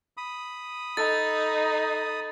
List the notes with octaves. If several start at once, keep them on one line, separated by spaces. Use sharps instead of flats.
B5 D#6
D#4 A4 A6